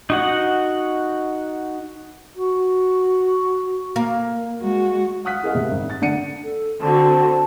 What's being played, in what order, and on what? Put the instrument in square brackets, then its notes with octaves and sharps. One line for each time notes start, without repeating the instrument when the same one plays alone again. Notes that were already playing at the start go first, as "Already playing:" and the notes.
[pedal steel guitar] D#4 F#4 F#5
[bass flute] F#4
[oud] A#3
[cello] G#3 F#4
[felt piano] F5 F#5 D#6 F#6 B6
E4 G#4 A#4 D#5 F5 F#5
C3
G#1
A6
D3 D4 F#5 C#7 D#7
[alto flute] A4
[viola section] D3 C4 F#4 [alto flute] A5